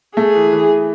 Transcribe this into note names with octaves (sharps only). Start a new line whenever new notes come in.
A3 G#4
E3
E3